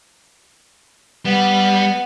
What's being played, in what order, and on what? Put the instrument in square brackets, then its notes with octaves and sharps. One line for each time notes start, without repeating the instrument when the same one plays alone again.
[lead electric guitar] G3 [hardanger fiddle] B3